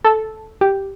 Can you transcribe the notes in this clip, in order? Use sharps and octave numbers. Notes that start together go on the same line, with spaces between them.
A4
G4